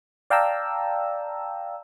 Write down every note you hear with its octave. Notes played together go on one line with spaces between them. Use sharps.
D5 F5 G5 A5 A#5 E6